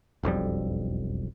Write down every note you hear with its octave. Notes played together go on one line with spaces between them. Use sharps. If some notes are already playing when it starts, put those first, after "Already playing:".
E1 B1 F2 G3